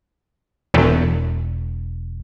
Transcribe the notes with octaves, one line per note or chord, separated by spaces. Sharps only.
E1